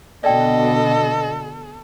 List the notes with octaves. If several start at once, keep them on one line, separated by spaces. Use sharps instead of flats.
B2 D3 A4 D5 D#5 G5